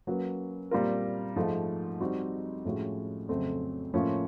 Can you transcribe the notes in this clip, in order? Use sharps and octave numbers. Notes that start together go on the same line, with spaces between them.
F#3 A#3 C#4 F#4 B4
A#2 G3 C4 F4 A#4
G#2 F3 A3
G3 C4 D#4 F#4
A2 F3 G#3 C#4 F#4
F2 C#3 F#3 A3 C4
A2 F3 A#3 C#4 F4